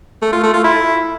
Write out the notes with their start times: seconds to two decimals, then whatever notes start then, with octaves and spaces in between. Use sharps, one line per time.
0.22 A3
0.33 F4
0.43 A3
0.54 F4
0.64 E4